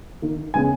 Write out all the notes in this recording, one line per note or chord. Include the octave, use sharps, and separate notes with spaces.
D#3 A#3
C#3 G#3 B3 G#5